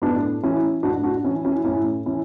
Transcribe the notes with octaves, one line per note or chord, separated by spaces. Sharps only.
A2 B3 D4
E3 C#4 E4
A2 D4 F#4
D4 F#4
E3 C#4 E4
C#4 E4
A2 C#4 E4
E3 C#4 E4